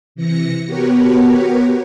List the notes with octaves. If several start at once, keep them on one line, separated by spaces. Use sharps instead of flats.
C3 E3 A#6 C#7
B3 F#4 G4 A#4 B4 C#5